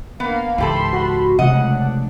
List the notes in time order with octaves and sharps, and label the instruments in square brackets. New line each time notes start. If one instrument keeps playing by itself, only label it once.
[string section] A#3 F5 [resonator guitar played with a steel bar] B3
[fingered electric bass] C#2 G#2 [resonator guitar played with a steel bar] E3 G4 A4 [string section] A5 B5 C6
[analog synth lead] F#4
[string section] C#2 A2 [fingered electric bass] C3 F3 A3 [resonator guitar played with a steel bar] D#5 [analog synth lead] F#5
[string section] D4